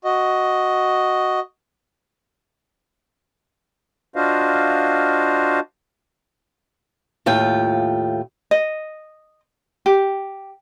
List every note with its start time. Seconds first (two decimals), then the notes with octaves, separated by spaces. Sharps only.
0.04 F#4 D#5
4.16 D4 F4 F#4 C5 D#5 F5
7.26 D#2 A2 F4 G5
8.51 D#5
9.86 G4